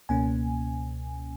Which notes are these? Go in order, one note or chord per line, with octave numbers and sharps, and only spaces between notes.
C#2 B2 A#3 C#4 G#5